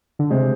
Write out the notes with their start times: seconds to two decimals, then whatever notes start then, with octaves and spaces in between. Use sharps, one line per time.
0.19 D3
0.30 C3 G#3 C4